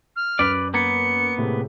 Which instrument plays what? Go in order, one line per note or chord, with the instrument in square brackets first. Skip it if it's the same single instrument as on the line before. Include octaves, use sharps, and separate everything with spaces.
[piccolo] F6
[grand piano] F#2 [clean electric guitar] B4 D5
[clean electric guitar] A#3 B3 [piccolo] C#7
[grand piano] A2 C3 G#3